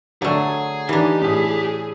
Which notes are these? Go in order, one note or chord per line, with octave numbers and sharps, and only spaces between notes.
D3 F#3 A3 G#4 G#5 C#6
E3 D4 D#4 G4
A2 G#4 D#6